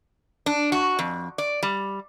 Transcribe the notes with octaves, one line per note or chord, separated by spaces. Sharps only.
D4
F#4
F2
D5
G3